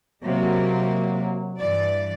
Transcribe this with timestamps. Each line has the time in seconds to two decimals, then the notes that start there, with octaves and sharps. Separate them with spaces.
0.23 C3 F#3 G#3 A#3
1.60 G2 E3 D5